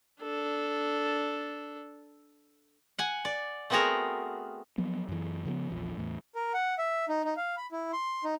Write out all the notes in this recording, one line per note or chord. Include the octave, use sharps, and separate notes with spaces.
D4 A4
F#5 G#5
D5
A3 B3 C4 F#4 G#4 A#4
F3 F#3 B3
F#2 E3
C#3 F3 A3 B3
A#1 E2 F3
E2 A2
A#4
F#5
E5
D#4
D#4
F5
B5
E4
C6
D#4